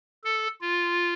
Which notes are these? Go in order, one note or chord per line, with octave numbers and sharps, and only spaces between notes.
A4
F4